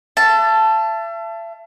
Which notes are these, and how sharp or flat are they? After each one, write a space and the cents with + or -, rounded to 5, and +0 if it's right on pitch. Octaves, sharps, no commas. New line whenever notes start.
E5 +40 A5 +0